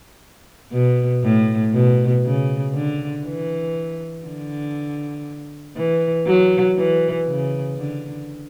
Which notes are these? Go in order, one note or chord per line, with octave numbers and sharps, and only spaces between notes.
B2
A2
B2
C#3
D3
E3
D3
E3
F#3
E3
C#3
D3